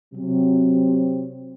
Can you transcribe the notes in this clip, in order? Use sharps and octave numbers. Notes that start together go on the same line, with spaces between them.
C3 F#3 C4